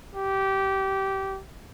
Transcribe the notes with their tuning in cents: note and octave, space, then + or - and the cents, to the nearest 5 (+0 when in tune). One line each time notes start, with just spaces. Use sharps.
G4 -20